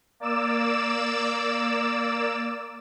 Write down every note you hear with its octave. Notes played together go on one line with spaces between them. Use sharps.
A#3 D5 D6 E6 E7